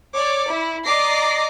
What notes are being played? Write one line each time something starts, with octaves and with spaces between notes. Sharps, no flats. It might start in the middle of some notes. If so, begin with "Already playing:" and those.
C#5 D5 D6
E4
D5 D#5 A#5 D6 A#6 C7